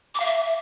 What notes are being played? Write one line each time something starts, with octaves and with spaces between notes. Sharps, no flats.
D6
F5
E5